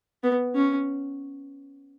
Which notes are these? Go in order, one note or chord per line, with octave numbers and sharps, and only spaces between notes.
B3
C#4